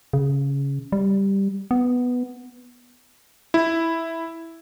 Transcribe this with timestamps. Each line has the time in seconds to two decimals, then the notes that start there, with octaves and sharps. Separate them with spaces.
0.13 C#3
0.92 G3
1.71 B3
3.54 E4